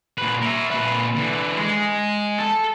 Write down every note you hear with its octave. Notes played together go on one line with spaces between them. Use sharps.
A#2 B4
A#4 E5
A#2 B4
D3 E3
G#3
A4